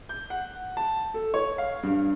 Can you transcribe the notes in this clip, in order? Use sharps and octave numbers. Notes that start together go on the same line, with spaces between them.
G6
F#5
A5
A4
C#5
F5
G2